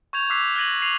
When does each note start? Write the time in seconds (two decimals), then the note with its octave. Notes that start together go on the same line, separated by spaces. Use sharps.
0.13 C#6 G6 G#6 F7
0.30 D6 E6 F#6 B6 C7
0.56 F6 F#6 G#6 A#6 D#7 F#7
0.82 C7 D#7 F7